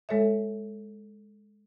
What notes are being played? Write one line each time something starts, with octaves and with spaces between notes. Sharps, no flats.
G#3 A4 C#5 E5